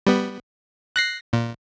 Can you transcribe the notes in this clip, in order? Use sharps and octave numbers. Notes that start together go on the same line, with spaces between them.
G3 B3
F#6 A#6 C7
A#2